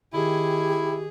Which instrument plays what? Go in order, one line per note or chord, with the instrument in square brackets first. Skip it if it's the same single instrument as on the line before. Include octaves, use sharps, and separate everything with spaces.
[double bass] D#3 [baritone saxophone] E4 [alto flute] G4 [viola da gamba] G#4